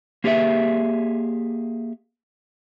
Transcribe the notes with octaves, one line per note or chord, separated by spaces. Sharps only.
A#3 G4 G#4 C#5 E5